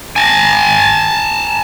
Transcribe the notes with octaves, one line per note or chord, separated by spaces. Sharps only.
G#5 A5